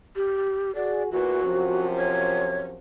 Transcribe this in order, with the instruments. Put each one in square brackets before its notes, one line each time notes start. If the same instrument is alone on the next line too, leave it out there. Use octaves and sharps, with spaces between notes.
[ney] G4
[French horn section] F#4 G#4 [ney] D5
[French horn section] E2 A#2 E3 [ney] F#4
[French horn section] F#2 C3 F3
[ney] C#5